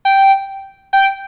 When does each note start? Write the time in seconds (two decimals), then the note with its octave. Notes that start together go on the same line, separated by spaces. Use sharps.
0.05 G5
0.93 G5